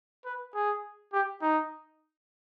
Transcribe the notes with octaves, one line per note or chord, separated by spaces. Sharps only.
B4
G#4
G4
D#4